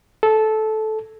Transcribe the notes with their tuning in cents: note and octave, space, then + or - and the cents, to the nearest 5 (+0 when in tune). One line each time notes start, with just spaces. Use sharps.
A4 -15